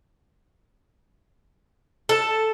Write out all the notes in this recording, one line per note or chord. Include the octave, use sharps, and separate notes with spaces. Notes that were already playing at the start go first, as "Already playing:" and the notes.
A4